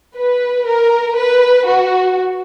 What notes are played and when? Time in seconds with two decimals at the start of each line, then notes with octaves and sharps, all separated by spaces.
0.17 B4
0.68 A#4
1.16 B4
1.67 F#4